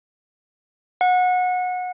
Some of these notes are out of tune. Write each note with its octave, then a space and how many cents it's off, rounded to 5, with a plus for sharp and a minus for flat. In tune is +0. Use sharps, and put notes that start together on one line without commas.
F#5 -25